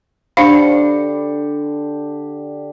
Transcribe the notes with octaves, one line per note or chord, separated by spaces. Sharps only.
D3 D4 G4 C5 F5 B5 C#7